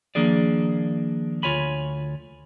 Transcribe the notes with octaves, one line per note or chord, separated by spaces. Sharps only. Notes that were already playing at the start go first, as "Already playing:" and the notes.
D#3 F3 A#3 D4 G#4 D5
D2 F4 C#5 G#5 B5